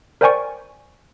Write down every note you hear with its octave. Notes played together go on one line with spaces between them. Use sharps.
A#4 C5 D5 G5 G#5 C#6